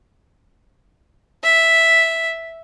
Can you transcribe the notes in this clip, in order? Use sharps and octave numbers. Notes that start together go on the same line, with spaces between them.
E5